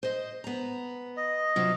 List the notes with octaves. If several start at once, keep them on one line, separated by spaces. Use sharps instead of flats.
C5 D#5
B3 A#5
D#5
C3 F#3 F4